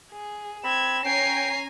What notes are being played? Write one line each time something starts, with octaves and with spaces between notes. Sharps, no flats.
G#4
C4 B5 G#6 E7
C#4 G5 G#5 A#5 C7